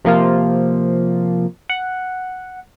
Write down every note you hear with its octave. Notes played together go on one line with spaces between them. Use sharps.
C3 F3 A#3 F4
F#5